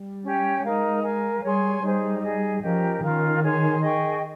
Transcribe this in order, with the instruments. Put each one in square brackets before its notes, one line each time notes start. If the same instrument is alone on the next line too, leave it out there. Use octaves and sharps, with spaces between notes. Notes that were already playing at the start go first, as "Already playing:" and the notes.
Already playing: [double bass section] G3
[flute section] C#4 G4 C#5 G5
[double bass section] G#3 [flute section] D#4 A#4 F5
[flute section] A#4 F5 G#5
[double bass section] G3 [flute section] G#4 C#5 G#5 C6
[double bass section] G3 [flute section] D#4 G#4 C5
[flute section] D#4 G#4 D#5
[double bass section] F3 [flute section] C#4 G4 A#4 D#5
[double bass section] D#3 [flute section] C#4 F4 A#4 F5
[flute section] G#4 C#5 G#5 C6
G#4 D#5 G5 C#6